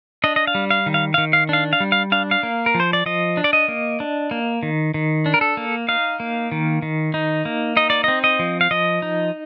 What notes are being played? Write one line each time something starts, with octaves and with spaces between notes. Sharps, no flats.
D4 D#5
D#5
F5
G3
F5
D#3
F5
D#3 F5
F5
D4 F5
F5
G3
F5
D4 F5
F5
A#3
A#4
F3
C5
D5
F3 D#5
D4
D5
D#5
A#3
D4
A#3
D#3
D#3
D4
A#4
A4
A#3
D#4 F5
A#3
D#3
D#3
D#4
A#3
D#4 D#5
D5
C4 D#5
D#5
F3
F5
F3 D#5
D#4